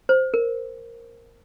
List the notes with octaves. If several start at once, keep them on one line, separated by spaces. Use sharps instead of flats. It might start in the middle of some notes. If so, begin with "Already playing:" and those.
C5
A#4